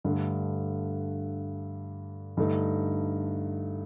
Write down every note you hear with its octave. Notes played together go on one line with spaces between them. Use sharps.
G2 D3 A3
G2 D3 A3 D#4